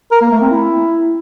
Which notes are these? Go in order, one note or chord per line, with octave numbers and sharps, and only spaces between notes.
A#4
A#3
A3
C4
E4